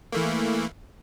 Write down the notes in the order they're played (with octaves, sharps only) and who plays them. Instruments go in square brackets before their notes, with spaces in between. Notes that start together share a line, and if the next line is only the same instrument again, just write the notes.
[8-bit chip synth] E3 A3 A#3